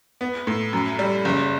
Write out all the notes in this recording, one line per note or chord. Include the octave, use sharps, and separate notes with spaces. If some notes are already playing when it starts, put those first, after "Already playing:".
B3
A2
F#2
G3
F#1